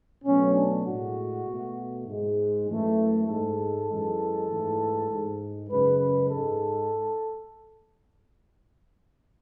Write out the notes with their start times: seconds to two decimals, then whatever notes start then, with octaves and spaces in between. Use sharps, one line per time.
0.25 B2 F#3 A3 C#4
0.55 D4
0.86 A2 G#3 F#4
1.46 B2 A3
2.06 G#2 G#3
2.67 F#2 E3 A3
3.27 G#2 G#3 A4
3.88 F#2 E3 G#3
4.49 G#2 E3 A3
5.10 G#2 G#3
5.69 F#2 C#3 G#3 B4
6.00 B4
6.30 G#2 G#3 A4